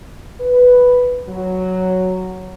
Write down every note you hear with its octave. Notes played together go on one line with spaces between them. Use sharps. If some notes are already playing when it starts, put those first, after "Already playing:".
B4
F#3